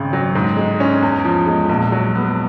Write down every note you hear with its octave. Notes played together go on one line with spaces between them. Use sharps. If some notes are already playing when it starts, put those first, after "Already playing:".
Already playing: G#1 C#3
F#3
G#2
G#3
C#4
E2
F3
G#3
A#1
F#3
B3